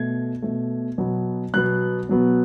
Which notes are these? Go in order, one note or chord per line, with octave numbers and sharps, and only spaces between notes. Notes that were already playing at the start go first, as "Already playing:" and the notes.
Already playing: B2 A3 G#6
B2 A3
B2 F#3 B3
B2 F#3 B3 F#6
B2 F#3 B3